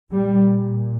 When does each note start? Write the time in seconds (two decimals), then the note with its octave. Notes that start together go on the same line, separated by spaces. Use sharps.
0.11 A#2 G3